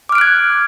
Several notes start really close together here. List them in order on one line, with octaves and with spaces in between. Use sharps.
D6 F6 D7 F#6 G#6